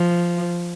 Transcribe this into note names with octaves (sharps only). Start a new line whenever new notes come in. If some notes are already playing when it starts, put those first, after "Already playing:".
Already playing: F3